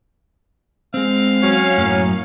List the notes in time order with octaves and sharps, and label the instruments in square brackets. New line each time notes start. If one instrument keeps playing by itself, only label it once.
[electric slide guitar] G#3 C4 [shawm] F5
[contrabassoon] F#3 [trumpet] C#4
[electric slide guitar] F#2 A2 A#3